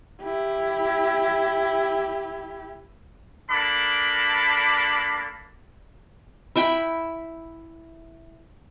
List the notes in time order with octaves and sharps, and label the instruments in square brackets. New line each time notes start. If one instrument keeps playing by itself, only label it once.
[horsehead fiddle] E4 G4
[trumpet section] A#3 D4 A4 B5 D6
[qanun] E4 E5 G5 B5